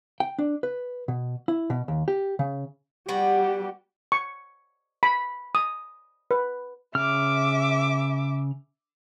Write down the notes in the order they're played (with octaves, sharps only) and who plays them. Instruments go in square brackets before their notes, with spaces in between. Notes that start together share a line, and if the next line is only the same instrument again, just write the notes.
[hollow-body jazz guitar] G5
D4
B4
B2
E4
B2
D#2
G4
C#3
[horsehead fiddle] G3 G4 [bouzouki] B3 F#4
[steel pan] C#6
B5
D#6
B4
[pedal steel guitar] C#3 F6 [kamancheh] E5 D6